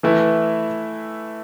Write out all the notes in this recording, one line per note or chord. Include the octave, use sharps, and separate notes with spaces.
E3 A3 E4 B4